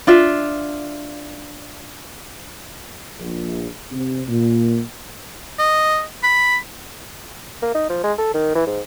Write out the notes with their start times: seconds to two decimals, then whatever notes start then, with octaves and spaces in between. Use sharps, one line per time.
0.07 D4 F4 E5
3.19 A#1
3.92 C3
4.28 A#2
5.59 D#5
6.23 B5
7.62 A#3
7.74 D#4
7.89 F3
8.04 G#3
8.18 A4
8.34 D#3
8.55 E3
8.67 G#2